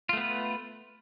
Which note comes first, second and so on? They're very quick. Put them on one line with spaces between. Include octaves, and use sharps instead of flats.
F4 A3 B3 B4